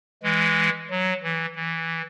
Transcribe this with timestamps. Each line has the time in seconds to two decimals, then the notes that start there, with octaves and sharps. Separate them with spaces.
0.23 E3 G#3
0.91 F#3
1.23 E3
1.56 E3